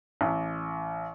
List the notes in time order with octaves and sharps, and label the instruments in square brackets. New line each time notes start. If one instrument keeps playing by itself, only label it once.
[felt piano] A1